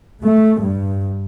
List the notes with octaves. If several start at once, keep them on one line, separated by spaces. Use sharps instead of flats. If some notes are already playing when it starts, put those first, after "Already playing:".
A3
G2